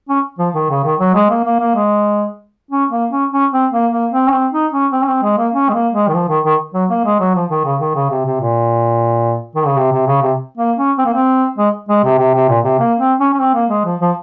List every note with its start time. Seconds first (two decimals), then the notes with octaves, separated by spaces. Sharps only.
0.09 C#4
0.39 F3
0.55 D#3
0.70 C#3
0.84 D#3
1.00 F#3
1.14 G#3
1.30 A#3
1.44 A#3
1.60 A#3
1.75 G#3
2.71 C#4
2.91 A#3
3.11 C#4
3.32 C#4
3.52 C4
3.72 A#3
3.92 A#3
4.11 C4
4.28 C#4
4.33 C4
4.53 D#4
4.73 C#4
4.92 C4
5.03 C#4
5.08 C4
5.23 G#3
5.38 A#3
5.53 C#4
5.69 G#3
5.74 A#3
5.94 G#3
6.08 D#3
6.14 F3
6.29 D#3
6.45 D#3
6.74 F#3
6.90 A#3
7.05 G#3
7.20 F#3
7.35 F3
7.50 D#3
7.65 C#3
7.80 D#3
7.95 C#3
8.10 C3
8.26 C3
8.41 A#2
9.55 D#3
9.66 C#3
9.77 C3
9.92 C3
10.07 C#3
10.22 C3
10.58 A#3
10.78 C#4
10.98 C4
11.06 A#3
11.14 C4
11.58 G#3
11.89 G#3
12.04 C3
12.19 C3
12.34 C3
12.49 A#2
12.64 C3
12.80 A#3
13.00 C4
13.20 C#4
13.33 C#4
13.40 C4
13.54 A#3
13.70 G#3
13.85 F3
14.01 F3